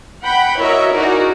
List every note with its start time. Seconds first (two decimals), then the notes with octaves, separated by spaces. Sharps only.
0.23 F#5 G5 B5
0.60 E4 F#4 A#4 C#5 D#5 E5
0.92 D#4 E4 F#4 G#4 A#4 D5